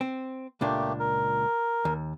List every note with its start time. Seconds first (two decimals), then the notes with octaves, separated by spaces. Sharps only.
0.01 C4
0.61 C#2 A#2 A3 A#3 D4 G4
0.99 A#4
1.85 D#2